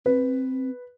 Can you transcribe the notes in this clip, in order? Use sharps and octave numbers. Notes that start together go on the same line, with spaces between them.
C4 B4